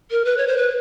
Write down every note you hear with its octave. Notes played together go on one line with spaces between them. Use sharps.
A#4
B4
C#5
C5
B4